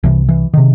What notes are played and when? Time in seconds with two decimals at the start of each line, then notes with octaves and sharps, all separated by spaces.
0.04 C2 C3 E3
0.29 E3
0.54 C3 D#3